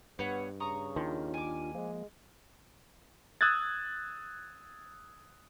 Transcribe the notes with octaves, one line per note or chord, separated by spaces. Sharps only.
G2 B3 B4 C#5 F#5
C#3 A#5 C#6 D#6
D#2 D#3 D4 F4
G#5 D6
F3 G#3 A#3
D#6 E6 F#6 G#6 A6